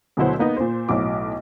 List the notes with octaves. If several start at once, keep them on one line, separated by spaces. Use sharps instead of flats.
D2 B2 F#3 E4 C5 F#5
A#3 B3 D#4
A#2 C5
B1 A2 F#3 D6